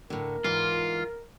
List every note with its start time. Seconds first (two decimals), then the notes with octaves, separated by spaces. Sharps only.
0.10 A2 D3 A#4
0.44 G#2 E3 F4